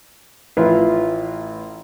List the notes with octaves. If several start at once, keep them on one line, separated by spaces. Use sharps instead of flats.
A1 E4 F4 B4